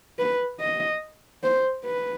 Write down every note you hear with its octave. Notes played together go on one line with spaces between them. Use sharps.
B4
D#5
C5
B4